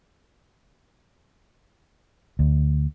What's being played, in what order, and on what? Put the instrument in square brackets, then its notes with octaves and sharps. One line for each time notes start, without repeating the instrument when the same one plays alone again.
[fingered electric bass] D2